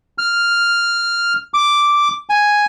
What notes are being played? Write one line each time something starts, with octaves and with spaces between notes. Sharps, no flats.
F6
D6
G#5